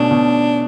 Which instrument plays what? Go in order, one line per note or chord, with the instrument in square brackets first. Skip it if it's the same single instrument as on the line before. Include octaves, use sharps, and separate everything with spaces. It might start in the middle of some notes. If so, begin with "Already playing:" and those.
Already playing: [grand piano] B2 A3 C#4 [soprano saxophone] D4
[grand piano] B2